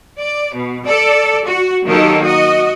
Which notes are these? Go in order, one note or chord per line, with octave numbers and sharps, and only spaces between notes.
D5
B2
A4 D5
F#4
D#3 F#3 A#3 D#4 G4 A4
F#4 D#5